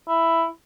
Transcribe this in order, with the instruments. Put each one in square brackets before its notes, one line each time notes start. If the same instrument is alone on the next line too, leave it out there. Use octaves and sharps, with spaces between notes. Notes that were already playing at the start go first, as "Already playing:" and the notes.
[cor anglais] E4